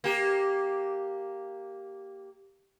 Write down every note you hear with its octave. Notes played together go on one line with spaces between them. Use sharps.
A#3 G4